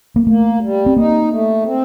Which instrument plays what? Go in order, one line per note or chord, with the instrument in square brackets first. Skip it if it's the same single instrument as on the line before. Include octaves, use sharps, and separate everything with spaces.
[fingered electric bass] A#3
[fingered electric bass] A3 [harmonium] A#3
[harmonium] G3
[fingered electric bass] C4
[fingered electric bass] A#3 [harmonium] D#4
[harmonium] A3
C4